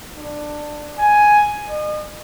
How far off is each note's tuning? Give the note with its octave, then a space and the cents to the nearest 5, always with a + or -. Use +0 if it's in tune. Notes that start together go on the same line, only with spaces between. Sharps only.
D4 +15
G#5 +5
D#5 -40